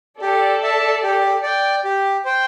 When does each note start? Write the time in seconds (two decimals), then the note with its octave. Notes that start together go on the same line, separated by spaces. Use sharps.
0.21 G4 A4 D5
0.63 E5 A5
1.03 G4
1.43 D5 G5
1.84 G4
2.25 C5 G5